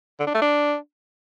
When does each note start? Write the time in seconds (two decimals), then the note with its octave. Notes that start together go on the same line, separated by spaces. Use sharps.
0.20 D3
0.27 D4
0.34 A3
0.42 D4